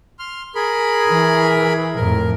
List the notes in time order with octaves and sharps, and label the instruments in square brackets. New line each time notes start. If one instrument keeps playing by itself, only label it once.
[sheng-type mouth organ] C6 F6
G#4 A#4 B5
[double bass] E3
[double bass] F2 A2 [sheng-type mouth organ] A#4